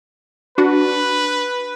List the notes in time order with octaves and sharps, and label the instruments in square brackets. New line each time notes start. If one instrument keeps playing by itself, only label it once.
[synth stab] D4 F#4 [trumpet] B4